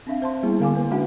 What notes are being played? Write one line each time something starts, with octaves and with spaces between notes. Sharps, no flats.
C4 D4 E5 F5
C5 A5 C6
G3 A#3 B3 E4 G#4
D3 F5 G#5 D6
A#3 B4
G#3 A#3 C#4 D4 F#4 F#5